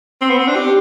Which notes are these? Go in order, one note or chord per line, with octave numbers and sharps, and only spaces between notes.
C4
B3
C4
D4
G4